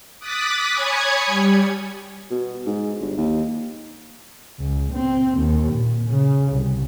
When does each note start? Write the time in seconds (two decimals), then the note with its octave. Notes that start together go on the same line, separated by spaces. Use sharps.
0.19 D6 D#6 F#6 A6 B6
0.74 C#5 G#5 B5 D#6 G#6 C#7
1.26 G3
2.31 B2
2.67 G#2
3.01 G1
3.17 D#2
4.60 C#2
4.93 C4
5.38 D#2
5.73 A#2
6.09 C#3
6.52 C2